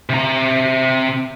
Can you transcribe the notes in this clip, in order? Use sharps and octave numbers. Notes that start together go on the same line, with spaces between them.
C3 A#5